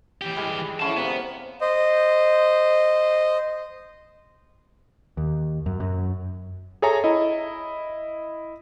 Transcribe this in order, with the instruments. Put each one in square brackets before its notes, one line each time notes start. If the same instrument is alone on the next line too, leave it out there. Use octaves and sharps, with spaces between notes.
[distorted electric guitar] E3 G4
[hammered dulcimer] G3 G#3 G#4
[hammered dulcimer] D3 C#4 E4 [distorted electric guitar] C5 A5
[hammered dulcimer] C3 A#3 [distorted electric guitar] B3
[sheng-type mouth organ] C5 D#5
[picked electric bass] D#2
F#2
F#2
[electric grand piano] G#4 A4 C#5 E5 G#5 A#5
E4 D#5